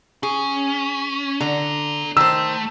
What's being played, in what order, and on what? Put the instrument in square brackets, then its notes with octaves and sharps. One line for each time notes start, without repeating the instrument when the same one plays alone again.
[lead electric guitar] C#4 [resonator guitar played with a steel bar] G#4
[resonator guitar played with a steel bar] D3 [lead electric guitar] D5 A#5
[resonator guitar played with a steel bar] D#3 C5 [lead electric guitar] A3 [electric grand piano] E6